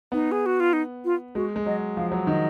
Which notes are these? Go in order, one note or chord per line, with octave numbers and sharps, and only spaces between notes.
B3 D#4
G#4
F#4
F4
D#4
F4
G#3 F#4
G#3
F#3 D#5
F3 F5
F#3
D#3 D#5